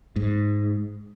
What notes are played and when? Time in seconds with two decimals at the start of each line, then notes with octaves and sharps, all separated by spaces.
0.16 G#2